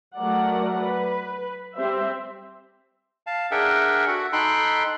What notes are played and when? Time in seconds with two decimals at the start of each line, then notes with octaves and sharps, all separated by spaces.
0.18 F#3 A3 A#4 D5 F#5
0.81 B4
1.76 G3 C4 G4 C5 E5
3.27 F5 A5
3.51 D4 G#4 A#4 E5 F#5 G5
4.07 F#4 A4 F#5
4.33 D#4 A4 G5 B5 C6 F#6